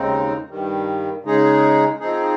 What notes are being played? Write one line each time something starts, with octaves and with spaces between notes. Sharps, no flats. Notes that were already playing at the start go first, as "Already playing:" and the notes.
Already playing: D#2 C#3 G#3 C4 D#4
G2 D#3 G3
C#3 G#3 D#4 G#4
F3 C4 D#4 G#4